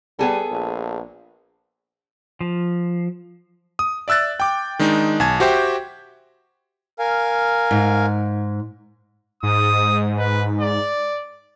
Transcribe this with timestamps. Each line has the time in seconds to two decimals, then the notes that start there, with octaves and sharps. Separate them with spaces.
0.19 G3 B3 G#4 A4
0.51 A#1
2.41 F3
3.79 D#6
4.08 D5 E5 E6 F#6 A6
4.40 G5 D6
4.79 D#3 G#3 D4 D#4
5.20 B1 G#5 A5 G#6
5.40 F#4 G4 C5 E5 G5
6.99 A#4 F5 G#5
7.71 G#2
9.43 G#2 D#6
10.19 B4
10.61 D5